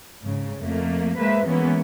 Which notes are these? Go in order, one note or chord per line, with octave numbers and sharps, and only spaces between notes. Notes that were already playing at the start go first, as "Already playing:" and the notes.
G#2 C#3
F2 A3 A#3
G#3 A#3 B4 C5 E5
E3 G#3 A#3 B3 C#4 E4